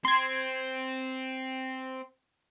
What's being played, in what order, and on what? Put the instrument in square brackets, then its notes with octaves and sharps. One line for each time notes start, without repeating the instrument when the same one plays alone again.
[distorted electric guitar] C4 [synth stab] C6 G#6